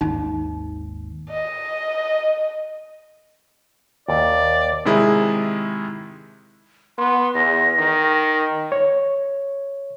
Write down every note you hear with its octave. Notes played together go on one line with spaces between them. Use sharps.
G#1 D#2 D#4
D#5
D#2 D5
C3 D#3 G#3 E4 G#4
B3 C6
E2 A#6
D#3
C#5